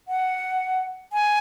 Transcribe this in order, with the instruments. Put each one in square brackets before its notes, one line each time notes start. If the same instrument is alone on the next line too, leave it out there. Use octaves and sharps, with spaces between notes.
[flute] F#5
G#5